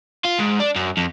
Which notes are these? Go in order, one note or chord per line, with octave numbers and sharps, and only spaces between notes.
F4
G#2
D4
F#2
F2